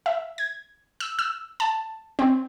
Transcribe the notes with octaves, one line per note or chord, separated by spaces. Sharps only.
E5
G#6
E6
E6
A5
C4